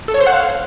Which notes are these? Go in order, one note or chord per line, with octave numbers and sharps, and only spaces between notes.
A4
C#5
C5
F#5
F5